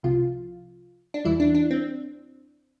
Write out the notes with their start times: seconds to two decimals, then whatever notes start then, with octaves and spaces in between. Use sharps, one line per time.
0.03 C2 C3 F3 F4
1.14 D4
1.25 E2 E3 G3 E4
1.40 D4
1.54 D4
1.71 C4